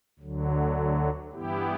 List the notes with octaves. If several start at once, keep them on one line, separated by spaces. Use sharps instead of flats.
D2 D3 F#3
G2 E3 B3 E4 G4